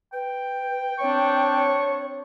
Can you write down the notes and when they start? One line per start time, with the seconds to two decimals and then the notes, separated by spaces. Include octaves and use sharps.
0.13 B4 G5
1.00 C4 D4 C#5 C#6